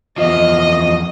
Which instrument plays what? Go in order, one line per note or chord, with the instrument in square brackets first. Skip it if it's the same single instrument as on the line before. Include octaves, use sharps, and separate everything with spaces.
[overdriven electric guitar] E2 F3 [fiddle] D#5